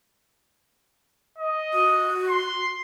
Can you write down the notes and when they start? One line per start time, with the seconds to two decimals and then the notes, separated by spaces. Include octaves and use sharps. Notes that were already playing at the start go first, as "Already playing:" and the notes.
1.38 D#5
1.73 F#4
2.29 C6